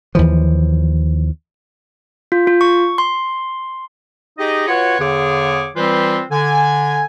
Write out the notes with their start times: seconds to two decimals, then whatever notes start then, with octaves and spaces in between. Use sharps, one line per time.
0.15 D#2 E3 F3
2.32 F4
2.47 F4
2.61 C#6
2.98 C6
4.38 D#4 G4 G#4 D#5
4.67 F4 F#4 B4 C#5
4.99 E2 D3 G#4 C#5 F5 D6
5.76 E3 G3 C4 F4 B4 C5
6.31 D3 G#5